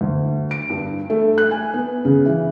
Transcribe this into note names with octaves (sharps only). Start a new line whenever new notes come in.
D2
D7
G2
A3
F#6
G#5
B3
C#3
E3